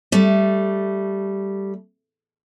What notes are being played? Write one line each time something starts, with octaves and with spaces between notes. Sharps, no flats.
G3 A3